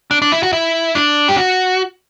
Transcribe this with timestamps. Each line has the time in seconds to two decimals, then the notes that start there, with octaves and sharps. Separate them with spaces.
0.11 D4
0.22 D4
0.32 E4
0.43 F#4
0.53 E4
0.95 D4
1.28 G4
1.37 F#4